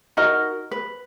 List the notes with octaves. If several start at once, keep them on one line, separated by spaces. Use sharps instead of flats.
D#4 F#4 A#4 D#5
B4